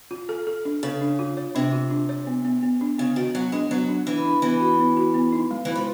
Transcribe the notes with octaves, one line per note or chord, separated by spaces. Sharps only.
F4
A4
A4
D4
C#3 A4
D4
F4
C#5
C3 D4
F4
D4
C#5
B3
B3
B3
D4
C#3 B3
D#3 F#4
F#3 B3
G#3 D4
F#3 B3
D4
E3 D4
D4
E3 B3
F#4
B3
F#4
B3
D#4
G#3
E3 G#3
F3